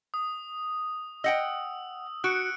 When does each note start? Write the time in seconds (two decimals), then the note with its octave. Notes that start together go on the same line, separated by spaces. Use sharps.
0.14 D#6
1.24 D#5 F#5 G5 E6
2.24 F#4 F#6 C#7 D7